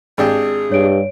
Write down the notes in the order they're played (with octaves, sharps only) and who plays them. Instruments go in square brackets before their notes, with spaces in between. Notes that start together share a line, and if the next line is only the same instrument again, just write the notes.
[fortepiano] G#1 D4 G4 [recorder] G#4
[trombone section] G2 [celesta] C#5 D7